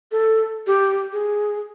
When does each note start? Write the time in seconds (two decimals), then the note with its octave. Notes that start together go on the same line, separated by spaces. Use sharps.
0.12 A4
0.67 G4
1.13 G#4